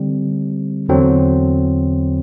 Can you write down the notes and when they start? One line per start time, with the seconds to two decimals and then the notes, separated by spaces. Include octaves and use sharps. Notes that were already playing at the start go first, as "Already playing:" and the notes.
Already playing: D3 G3 C4
0.89 E2 D3 F#3 C4